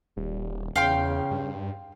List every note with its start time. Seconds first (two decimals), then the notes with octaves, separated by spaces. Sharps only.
0.17 D#1 G3
0.76 E2 C#3 F5 G5 C6
1.31 G2